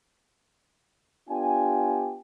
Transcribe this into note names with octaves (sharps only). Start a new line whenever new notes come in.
B3 D4 F4 G4 G5 G#5